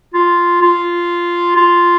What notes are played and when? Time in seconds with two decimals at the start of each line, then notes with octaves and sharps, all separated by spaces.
0.14 F4
0.61 F4
1.56 F4